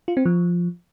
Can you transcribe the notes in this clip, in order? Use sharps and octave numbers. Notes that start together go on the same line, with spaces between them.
F4
C4
F3